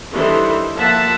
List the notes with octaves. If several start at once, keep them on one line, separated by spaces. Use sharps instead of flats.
D#3 E3 G3 D4 A4 C5
F3 A#3 E5 F#5 A5